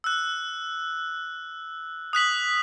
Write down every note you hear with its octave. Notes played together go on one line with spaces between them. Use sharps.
E6 F#6
D#6 F#6 B6 F#7